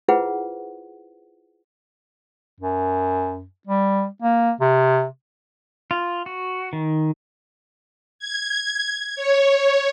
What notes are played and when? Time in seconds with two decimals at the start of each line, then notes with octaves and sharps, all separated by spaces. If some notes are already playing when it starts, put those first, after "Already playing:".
0.08 E4 F4 G#4 B4 C5 F#5
2.61 F#2
3.67 G3
4.22 A#3
4.61 C3
5.91 F4
6.26 F#4
6.73 D#3
8.19 G#6
9.16 C#5